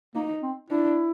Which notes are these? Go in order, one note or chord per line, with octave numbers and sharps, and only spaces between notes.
A#3 D#4
C4
D4 E4